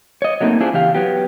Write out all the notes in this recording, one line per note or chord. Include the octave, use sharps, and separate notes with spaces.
C#5 D#5
F#3 A3 A#3 C4 D#4
C#4 D4 E4 F4 G#4 C5
C#3 E3 G4 F5
F#3 B3 G4